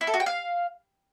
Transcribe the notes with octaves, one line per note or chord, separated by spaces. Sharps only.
E4
A4
F#4
G5
F5